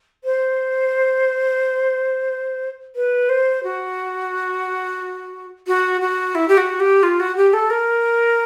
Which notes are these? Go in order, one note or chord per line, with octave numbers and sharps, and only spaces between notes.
C5
B4
C5
F#4
F#4
F#4
E4
G4
F#4
G4
F4
F#4
G4
A4
A#4